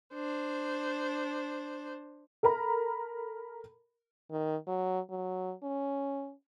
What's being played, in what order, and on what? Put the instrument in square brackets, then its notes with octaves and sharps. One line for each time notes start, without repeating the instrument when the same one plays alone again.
[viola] D4 C5
[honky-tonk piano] A4 A#4 A#5 B5
[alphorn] D#3
F#3
F#3
C#4